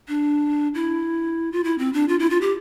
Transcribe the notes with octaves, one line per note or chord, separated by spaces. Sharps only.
D4
E4
F4
E4
C4
D4
F4
E4
F4
G4